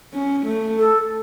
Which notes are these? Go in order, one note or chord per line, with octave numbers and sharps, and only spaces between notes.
C#4
A3
A4